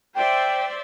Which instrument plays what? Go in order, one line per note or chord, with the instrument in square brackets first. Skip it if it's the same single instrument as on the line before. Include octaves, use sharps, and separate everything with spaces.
[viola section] C5 D5 E5 [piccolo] G5